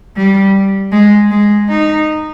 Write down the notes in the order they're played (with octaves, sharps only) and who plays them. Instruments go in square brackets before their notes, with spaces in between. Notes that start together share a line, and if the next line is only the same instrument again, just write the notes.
[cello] G3
G#3
G#3
D#4